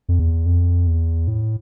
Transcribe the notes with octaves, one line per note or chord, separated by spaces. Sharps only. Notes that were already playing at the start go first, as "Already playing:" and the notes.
F2
E2
F2
E2
A2